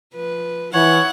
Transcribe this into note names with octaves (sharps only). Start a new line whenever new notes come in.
F3 B4
E3 E4 C#5 F#5